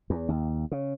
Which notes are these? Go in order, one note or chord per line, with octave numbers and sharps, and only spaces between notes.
E2
D#2
C#3